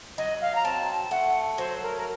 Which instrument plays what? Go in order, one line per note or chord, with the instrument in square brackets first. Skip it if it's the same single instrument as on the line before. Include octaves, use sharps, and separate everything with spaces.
[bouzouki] F#3 [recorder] D#5
[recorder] F5
A#5
[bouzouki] C4 [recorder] A5
[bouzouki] A3 [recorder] F#5
[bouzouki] F#3 [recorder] C5
[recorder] A#4
A#4